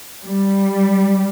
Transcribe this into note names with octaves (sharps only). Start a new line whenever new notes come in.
G3